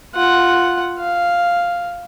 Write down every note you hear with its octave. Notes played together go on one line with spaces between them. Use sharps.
F4 F#5
F5